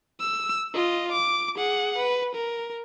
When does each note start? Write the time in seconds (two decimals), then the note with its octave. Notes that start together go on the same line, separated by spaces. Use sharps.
0.20 E6
0.74 F4 D#5
1.12 D6
1.56 G#4 F#5
1.98 B4
2.35 A#4